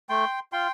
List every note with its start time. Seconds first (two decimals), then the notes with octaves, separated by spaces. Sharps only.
0.09 A3 G5 C6
0.52 F4 G5 C6